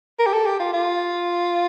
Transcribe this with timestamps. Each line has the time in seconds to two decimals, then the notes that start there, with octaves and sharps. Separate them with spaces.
0.19 A#4
0.26 G4
0.33 A4
0.46 G4
0.60 F4
0.73 F4